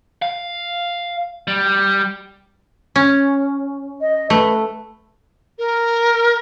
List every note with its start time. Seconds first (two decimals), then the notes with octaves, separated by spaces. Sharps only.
0.22 F5
1.47 G3
2.96 C#4
4.01 D#5
4.30 A3 B4
5.58 A#4